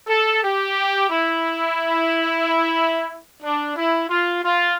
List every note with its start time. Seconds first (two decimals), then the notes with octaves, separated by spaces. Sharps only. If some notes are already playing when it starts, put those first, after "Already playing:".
0.09 A4
0.43 G4
1.09 E4
3.43 D4
3.76 E4
4.09 F4
4.43 F4